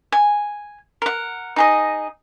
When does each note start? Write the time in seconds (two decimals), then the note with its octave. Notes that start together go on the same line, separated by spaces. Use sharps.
0.12 G#5
1.02 A#4 F#5
1.56 D#4 G#4 D#5